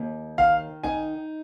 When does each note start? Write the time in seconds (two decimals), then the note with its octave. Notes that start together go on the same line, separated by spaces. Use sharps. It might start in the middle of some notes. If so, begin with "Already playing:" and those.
Already playing: D#2
0.38 D#3 F5
0.83 D#4 G#5